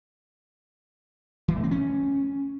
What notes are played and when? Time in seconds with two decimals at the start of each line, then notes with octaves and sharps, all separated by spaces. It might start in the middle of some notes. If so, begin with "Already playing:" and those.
1.48 E3
1.56 A3
1.63 C4
1.71 C#4